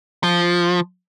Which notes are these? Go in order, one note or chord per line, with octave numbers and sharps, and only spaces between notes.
F3